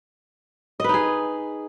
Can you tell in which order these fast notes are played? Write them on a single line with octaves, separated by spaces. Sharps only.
D#5 B4 D#4 G#4